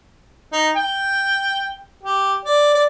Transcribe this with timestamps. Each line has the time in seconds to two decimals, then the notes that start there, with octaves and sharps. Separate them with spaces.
0.53 D#4
0.76 G5
2.03 G4
2.45 D5
2.75 D5